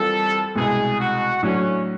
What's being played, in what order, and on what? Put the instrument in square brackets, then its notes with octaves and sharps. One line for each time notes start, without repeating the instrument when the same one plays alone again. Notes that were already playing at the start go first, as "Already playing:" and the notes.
Already playing: [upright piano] E3 G3 C4 F4 A#4 [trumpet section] A4
[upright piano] C2 B2 G#3 [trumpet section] G#4
[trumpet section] F#4
[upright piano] A2 F#3 A3 D4 F#4 [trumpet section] C#4